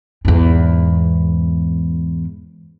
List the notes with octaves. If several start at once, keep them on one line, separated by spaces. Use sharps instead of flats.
E2 G#2